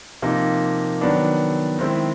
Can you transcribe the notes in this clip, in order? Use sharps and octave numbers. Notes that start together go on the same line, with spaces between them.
C3 F3 A#3 D#4
D#3 F#3 B3 D4
D#3 G#3 C4 E4